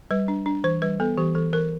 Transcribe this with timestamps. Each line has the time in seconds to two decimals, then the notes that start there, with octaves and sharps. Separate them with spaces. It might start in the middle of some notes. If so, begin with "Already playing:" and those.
0.11 G3 B4
0.28 D4
0.46 D4
0.64 E3 C5
0.82 G3 B4
1.00 B3 A4
1.18 E3 G4
1.35 E3 A4
1.53 E3 A#4